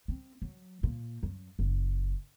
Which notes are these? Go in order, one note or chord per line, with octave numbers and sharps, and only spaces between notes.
C4
F#3
A#2
F#2
F#1